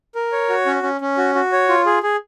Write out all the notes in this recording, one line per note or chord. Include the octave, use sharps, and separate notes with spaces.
A#4
C#5
F#4
C#4
C#4
C#4
F#4
F#4
C#5
F4
G#4
G#4